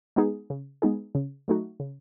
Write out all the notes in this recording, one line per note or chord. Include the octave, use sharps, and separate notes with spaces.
G#3 B3 D#4 G#4
C#3
G#3 B3 D#4 G#4
C#3
F#3 A3 D#4 F#4
C#3